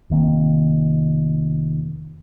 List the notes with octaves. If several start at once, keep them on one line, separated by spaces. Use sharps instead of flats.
F1 D#3 A#3 C4